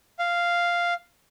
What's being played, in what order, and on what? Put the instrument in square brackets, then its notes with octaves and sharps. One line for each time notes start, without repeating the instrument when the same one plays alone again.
[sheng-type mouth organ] F5